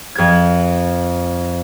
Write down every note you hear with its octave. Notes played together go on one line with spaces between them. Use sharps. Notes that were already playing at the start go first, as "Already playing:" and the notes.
F2 G#6